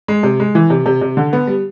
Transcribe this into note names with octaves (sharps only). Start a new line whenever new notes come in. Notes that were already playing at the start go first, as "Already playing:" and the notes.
G#3
C3
G#3
E3
C3
C3
C3
D3
B3
G3